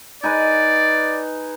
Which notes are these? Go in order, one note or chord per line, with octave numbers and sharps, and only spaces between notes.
D#4 G#4 B4 D5